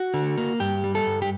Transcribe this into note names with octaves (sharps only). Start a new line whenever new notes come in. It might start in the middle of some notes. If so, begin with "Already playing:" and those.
Already playing: F#4
D3
A#3
G2 G4
G3
A4
G2
G4